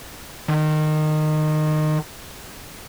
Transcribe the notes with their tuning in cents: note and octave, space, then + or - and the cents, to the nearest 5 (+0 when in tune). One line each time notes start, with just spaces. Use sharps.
D#3 -20